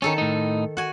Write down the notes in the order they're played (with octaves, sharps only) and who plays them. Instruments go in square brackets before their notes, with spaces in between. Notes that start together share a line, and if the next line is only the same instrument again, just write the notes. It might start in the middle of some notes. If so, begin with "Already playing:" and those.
[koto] D#3 A4 A5 [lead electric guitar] C#4
[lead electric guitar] A2 D#4
[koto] F#4 G#5